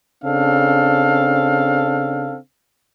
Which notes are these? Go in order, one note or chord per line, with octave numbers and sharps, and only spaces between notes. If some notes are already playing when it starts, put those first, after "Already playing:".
C#3 C4 D4 A4 F5